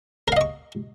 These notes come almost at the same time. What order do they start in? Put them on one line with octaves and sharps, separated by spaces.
A#4 F5 D#5 C#6